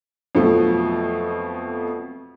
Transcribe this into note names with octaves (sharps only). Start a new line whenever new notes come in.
F2 B2 F3 F#3 A3